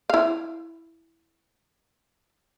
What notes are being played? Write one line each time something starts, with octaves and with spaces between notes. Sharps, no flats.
E4 F5